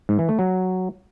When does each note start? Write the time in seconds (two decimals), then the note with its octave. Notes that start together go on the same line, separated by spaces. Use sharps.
0.09 G#2
0.19 E3
0.29 A3
0.39 F#3